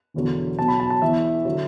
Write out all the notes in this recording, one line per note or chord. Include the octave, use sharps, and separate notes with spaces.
E1 E2 D3 F#3
B1 B2 F#3 A5
B5
A5
A5
E2 E3 E5
D3 F#3